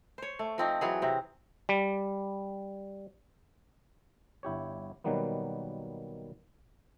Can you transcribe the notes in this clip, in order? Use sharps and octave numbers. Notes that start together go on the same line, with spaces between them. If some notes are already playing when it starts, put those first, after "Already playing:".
C5 C#5
A3
F3 C4 D#4
E3 F#3 G#4
C3 C4
G3
G1 E4 G4 C#5
B2 D#3 F#3 G3 A#3 B3